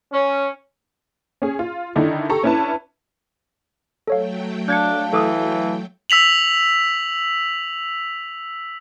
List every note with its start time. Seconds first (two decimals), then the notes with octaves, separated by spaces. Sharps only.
0.13 C#4
1.42 C#4 G#4
1.59 F4
1.96 D3 D#3 D#4 E4 A4
2.29 G4 A4 A#5 C#6
2.43 C#4 D4 E4 B4 A5
4.07 F#3 A3 A4 C#5 F5 G5
4.68 D4 F5 A5 G6 G#6 C#7
5.13 E3 A4 D6 D#6
6.10 E6 B6 F7 F#7